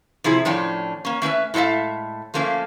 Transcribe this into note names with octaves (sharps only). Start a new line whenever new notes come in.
C3 F3 E4 G#4
A2 F3 C#4 D4 G5
A#3 C#4
A3 C#4 B4 E5
A2 G#3 A4 E5 F5
F3 A3 A#3 C#4 F5